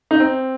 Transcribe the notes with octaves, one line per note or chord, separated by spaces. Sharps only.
D#4
C4